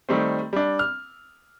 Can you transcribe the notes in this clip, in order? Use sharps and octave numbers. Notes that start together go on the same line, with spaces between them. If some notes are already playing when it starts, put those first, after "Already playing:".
D#3 G3 A3 C4
G3 D4
F6